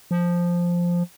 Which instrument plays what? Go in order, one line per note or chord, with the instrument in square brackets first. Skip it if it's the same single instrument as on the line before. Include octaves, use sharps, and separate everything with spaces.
[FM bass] F3